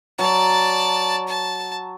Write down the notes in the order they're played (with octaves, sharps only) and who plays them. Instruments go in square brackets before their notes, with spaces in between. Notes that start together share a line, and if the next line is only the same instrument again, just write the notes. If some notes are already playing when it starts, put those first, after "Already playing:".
[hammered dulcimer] F#3 [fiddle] D5 A5
[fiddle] A5